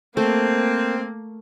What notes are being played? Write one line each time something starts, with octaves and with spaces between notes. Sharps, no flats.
A3 A#3 C4